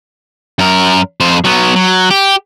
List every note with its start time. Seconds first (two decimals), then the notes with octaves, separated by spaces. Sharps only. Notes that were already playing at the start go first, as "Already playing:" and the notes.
0.59 F#2 A#4
1.20 F2 C5
1.44 F#3 B3
1.76 F#3
2.11 G4